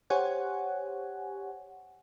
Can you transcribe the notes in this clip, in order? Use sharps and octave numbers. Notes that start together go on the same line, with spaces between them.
G4 C5 C#5 F#5 G#5